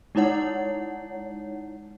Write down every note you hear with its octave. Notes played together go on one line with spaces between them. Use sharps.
G#3 D#4 E4 C#5 F#5